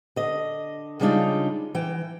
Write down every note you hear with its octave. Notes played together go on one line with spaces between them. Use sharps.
D3 D#5
C#3 G3 G#3 D4 D#4 F4
E3 G5